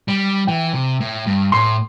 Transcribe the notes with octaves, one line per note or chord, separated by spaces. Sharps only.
G3
E3 G5
C3
A2
G2
A2 C6